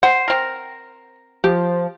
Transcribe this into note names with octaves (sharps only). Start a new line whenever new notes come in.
C5 F#5
C4 A#4
F3 G4